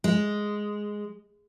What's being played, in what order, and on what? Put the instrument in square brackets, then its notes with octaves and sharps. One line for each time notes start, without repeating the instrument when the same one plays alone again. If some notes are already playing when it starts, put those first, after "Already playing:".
[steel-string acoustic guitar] G#3